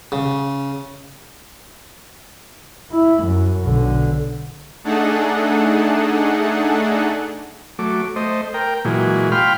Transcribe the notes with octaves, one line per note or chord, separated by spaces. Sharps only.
C#3
E4
F#2
B1 D3
A3 D4 D#4 G#4 A4 F#5
F#3 A3 D6
A3 C5 D#5
A#4 G5
A#2 E3 F#3 G#3
F5 G5 B5 C6 F6